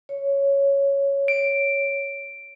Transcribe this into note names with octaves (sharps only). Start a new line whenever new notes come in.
C#5
D7